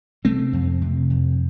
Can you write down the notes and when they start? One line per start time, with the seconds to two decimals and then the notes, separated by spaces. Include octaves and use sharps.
0.25 C3 A3 C4
0.53 F2
0.82 C3
1.10 F2